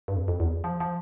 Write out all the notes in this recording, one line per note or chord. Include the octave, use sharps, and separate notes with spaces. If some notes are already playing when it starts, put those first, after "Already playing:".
G2
F2
F2
E2
F3
F3